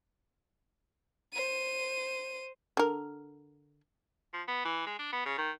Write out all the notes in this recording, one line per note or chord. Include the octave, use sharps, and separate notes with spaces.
C5 D#7
D3 A#4
F3
B3
E3
G#3
D4
B3
C#3
D#3